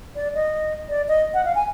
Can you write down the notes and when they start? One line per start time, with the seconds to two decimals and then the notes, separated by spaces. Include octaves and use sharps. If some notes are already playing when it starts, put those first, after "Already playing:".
0.16 D5
0.34 D#5
0.89 D5
1.08 D#5
1.34 F#5
1.45 F5
1.55 G#5